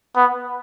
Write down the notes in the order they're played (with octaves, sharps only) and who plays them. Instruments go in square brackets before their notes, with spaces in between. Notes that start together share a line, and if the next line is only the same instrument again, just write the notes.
[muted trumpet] B3